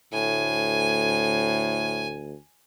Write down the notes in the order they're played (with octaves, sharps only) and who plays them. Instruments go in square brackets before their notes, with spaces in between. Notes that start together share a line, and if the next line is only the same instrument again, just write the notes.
[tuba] D2 [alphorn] A2 [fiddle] G#5